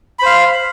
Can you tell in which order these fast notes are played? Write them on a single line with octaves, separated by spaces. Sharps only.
B5 C5 F5